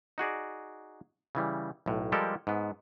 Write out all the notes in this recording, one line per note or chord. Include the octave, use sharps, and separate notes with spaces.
D#4 F#4 G#4 D5
C#3 E3 G3
B1 A2
F3 G3 G#3 G4 A4 A#4
G#2 B3